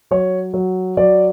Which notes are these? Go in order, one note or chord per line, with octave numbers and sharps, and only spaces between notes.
F#3 C#5
F#3
F#3 D5